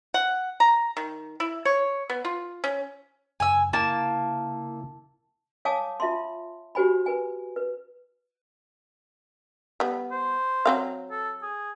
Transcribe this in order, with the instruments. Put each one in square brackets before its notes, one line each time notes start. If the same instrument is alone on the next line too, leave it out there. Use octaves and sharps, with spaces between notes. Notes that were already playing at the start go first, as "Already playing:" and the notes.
[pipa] F#5
A#5
D#3
E4
C#5
B3
F4
C#4
[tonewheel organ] F#2 C#3 [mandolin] G#5 E6
[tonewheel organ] C#3 E4 [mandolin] A#3 [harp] A5 E7
[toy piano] C#5 F5 G#5 A5 D6 D#6
F4 E5 A5 C6
F#4 G4 C5 G#5 B5
B4 G#5
B4
[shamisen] G3 B3
[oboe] C5
[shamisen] F#3 C4 F5
[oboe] A4
G#4